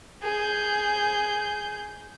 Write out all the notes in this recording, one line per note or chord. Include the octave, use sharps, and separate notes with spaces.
G#4 G6